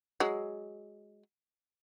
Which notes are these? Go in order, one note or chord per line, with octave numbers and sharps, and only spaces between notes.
F#3 G#3